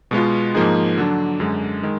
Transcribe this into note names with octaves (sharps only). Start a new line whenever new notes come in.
B2 G#3 B3 F4
G#2 F3 A#3 D#4 G#4
D3 F#3 D4
F#2 D3 G#3
D#3 G#3